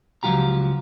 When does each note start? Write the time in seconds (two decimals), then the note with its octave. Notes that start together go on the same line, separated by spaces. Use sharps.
0.23 C#2 F3 F#3 F4 G4 A#5